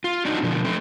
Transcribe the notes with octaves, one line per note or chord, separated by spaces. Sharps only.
F4
C4 D4 D#4 F#4
B2 D3 F3
A3 C4